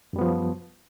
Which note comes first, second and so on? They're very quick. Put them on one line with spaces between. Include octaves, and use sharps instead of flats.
F#2 G3 B3 F3